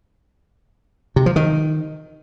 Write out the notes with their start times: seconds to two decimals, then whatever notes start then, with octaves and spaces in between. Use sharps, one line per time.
1.16 C3
1.26 F3
1.36 D#3